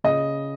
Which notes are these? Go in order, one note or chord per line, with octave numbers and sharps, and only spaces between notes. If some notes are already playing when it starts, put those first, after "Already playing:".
C#3 D#5